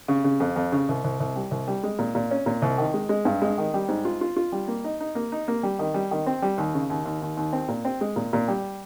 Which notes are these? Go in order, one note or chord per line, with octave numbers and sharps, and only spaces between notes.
C#3
C#3
F2
F2
C#3
C2
C2
C2
G3
C2
G3
G#3
A#2
A#2
C#4
A#2
C2
D#3
G#3
G#3
G2
G#3
D#3
G3
G#2
F4
F4
F4
G3
A#3
D#4
D#4
A#3
D#4
A#3
G3
D#3
G3
D#3
C4
G3
D#2
C#3
D#2
D#2
D#2
D#2
C4
A#2
C4
G#3
A#2
A#2
G3